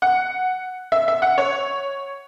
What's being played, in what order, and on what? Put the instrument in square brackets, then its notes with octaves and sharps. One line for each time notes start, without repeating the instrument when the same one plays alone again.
[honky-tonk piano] F#5
E5
E5
F#5
C#5